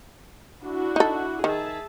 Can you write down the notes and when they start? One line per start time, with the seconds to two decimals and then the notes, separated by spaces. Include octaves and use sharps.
0.62 D4 E4 F#4
0.96 D#4 A4
1.44 D#3 G#4 E5 A5